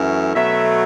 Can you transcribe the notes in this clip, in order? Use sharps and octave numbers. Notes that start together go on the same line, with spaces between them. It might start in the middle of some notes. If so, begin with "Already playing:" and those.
Already playing: F#2 E3 A3
B2 F#3 A3 E5